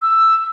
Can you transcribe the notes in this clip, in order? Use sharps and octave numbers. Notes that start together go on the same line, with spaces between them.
E6